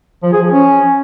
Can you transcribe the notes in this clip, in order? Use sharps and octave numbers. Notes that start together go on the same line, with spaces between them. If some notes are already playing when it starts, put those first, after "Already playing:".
F3
G#4
F3
C#4